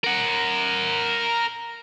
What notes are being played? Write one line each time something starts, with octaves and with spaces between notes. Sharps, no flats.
A#4 F#5